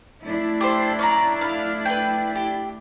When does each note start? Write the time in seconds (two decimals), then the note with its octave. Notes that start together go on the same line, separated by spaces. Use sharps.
0.23 A3 D4 E4
0.61 G4 A4 C5
0.99 C#4 D5 A#5
1.41 F5 B5
1.86 B4 G5
2.36 G4